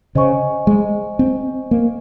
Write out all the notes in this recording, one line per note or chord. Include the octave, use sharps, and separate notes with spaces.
C#3 C5 D#5 G#5 C#6
G#3
C4
A#3